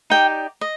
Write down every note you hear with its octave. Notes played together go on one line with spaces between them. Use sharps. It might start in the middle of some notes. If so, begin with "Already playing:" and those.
D#4 G4 D5 G5
D#5